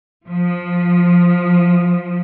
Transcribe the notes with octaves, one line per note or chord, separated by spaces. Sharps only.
F3